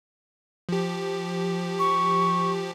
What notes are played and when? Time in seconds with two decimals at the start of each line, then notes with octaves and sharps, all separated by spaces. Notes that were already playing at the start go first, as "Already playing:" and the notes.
0.69 F3 G4
1.79 C#6